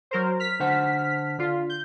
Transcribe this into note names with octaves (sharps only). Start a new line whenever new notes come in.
F#3 A#4 C5
F6 B6
D3 C5 F#5
D3 F4
G6